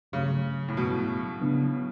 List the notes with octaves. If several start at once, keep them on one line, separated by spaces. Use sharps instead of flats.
G2 C#3 F#3 A3
A2
G2 B2 F#3 A3
C#3 F#3 B3 D4